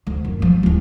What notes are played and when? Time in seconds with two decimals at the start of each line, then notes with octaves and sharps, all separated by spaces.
0.07 D2
0.25 F#2
0.40 F#2 F3
0.63 D1 A1